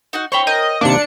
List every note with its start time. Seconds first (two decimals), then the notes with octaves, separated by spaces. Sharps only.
0.13 D#4 F#4 F#5
0.32 C5 C#5 E5 G5 B5 C#6
0.47 A#4 D#5 G6
0.81 C3 D#3 A#3 D4 C#7